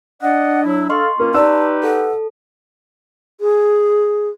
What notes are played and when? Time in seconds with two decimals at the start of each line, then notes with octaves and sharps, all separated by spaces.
0.22 D4 D5 D#5 F#5
0.64 F#3 E4
0.90 A4 D#5 F5 C6 C#6
1.20 A#3 C#4 F4 A#4
1.34 D#4 G4 B4 D5 A5 E6
1.84 A4 F#5
3.40 G#4